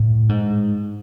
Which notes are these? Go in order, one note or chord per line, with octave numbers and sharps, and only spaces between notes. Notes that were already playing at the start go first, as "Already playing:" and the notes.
Already playing: A2
G#2